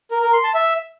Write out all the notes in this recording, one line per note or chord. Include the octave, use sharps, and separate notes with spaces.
A#4
A#4
C6
A5
E5